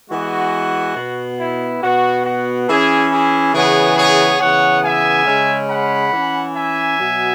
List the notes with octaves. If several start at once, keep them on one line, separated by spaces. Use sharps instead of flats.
E3 G#3 B3 F#4
B2 B3
E4
B2 B3 F#4
F#4
E3 C#4 E4 G#4
E4 G#4
C#3 E3 B3 G#4 C#5
G#4 C#5
C#3 E3 B3 C#5 F#5
E5 G#5
C#3 G#3 C#4
F#5 B5
E3 C#4
E5 G#5
B2 F#3 B3